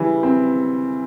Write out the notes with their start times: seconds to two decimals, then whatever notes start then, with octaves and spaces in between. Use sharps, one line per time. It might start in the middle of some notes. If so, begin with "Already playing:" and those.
Already playing: C#3 E3 G3
0.23 C4